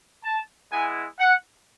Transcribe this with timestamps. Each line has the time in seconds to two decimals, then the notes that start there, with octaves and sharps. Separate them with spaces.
0.24 A5
0.71 G#3 B3 E4 G#5
1.19 F#5